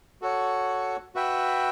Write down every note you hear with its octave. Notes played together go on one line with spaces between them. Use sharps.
F#4 A4 C#5 F#5
F#4 B4 E5 G5